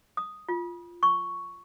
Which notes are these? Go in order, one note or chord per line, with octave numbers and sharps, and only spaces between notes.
D#6
F4
C#6